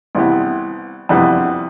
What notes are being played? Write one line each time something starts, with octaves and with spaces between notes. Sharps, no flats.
C2 C3 E3 B3
F2 C3 E3 G3 B3